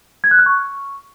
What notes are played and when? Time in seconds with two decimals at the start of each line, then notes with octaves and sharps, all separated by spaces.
0.24 G#6
0.31 F#6
0.39 F6
0.46 C#6